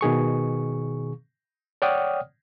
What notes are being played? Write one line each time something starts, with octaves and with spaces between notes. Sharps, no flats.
B2 D#3 G#4 C#6
C#5 D5 F#5 G5 D#6 F6